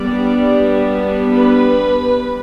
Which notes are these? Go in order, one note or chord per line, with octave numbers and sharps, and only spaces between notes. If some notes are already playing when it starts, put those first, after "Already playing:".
Already playing: G3 B3 D4 D5
B4